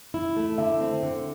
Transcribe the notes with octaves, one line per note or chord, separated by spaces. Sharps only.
E4
A3
D3 E5
C4
D3